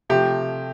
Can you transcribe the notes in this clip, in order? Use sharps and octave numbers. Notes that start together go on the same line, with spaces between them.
C3 F3 A3 G4